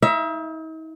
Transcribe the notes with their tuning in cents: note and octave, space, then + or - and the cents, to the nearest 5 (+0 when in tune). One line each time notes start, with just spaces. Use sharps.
D#4 +45 E5 +25